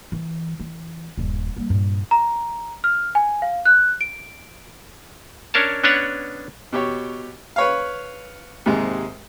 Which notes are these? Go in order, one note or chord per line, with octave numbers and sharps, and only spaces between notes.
E3
E3
D#1 G2
G3 A#3
G2 A#2
A#5
F6
G#5
F5
F#6
D7
C#4 D4 A#4 C#5 A5
B3 C#4 D4 B4 C#5 F#5
B2 G4 C#5
B4 C#5 F5
D#2 G#2 C3 G#3